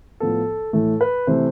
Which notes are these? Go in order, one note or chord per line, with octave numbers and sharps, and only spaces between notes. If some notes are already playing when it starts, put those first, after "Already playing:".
A2 F3 B3 A4
A2 E3 A3 A4
B4
C3 E3 A3 C5